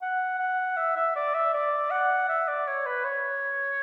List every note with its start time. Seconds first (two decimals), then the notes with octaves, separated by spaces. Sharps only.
0.02 F#5
0.39 F#5
0.77 E5
0.96 E5
1.16 D5
1.34 E5
1.54 D5
1.91 F#5
2.29 E5
2.48 D5
2.67 C#5
2.86 B4
3.05 C#5